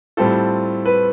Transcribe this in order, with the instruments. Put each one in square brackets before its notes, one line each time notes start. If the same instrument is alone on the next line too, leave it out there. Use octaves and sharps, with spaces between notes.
[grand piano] A2 G3 C4 F4 A4
B4